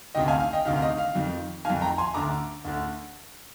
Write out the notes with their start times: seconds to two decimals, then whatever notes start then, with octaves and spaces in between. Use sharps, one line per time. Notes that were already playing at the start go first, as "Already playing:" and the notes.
0.15 D2 C3 D#3 D#5 G5
0.28 F5 G#5
0.39 F5
0.53 D#5 G5
0.65 D2 C3 D#3 F5
0.76 F5
0.82 D#5
0.98 F5
1.15 F2 D#3
1.65 D#3 F5 G#5
1.69 F2
1.81 G5 A#5
1.98 G#5 C6
2.14 D2 D3 A#5 D6
2.65 D2 D3